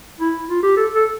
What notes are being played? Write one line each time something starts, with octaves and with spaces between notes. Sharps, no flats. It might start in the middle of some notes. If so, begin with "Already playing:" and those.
E4
F4
G4
A4
A4